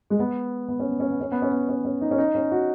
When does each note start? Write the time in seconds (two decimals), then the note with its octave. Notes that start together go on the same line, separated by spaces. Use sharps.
0.10 G#3
0.19 B3
0.69 B3
0.80 C#4
0.89 B3
1.00 C#4
1.10 B3
1.21 C#4
1.32 B3
1.42 C#4
1.52 B3
1.69 C#4
1.85 C#4
2.01 D#4
2.11 C#4
2.18 D#4
2.35 C#4
2.51 F#4